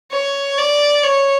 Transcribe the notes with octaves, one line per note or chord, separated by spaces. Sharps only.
C#5
D5
C#5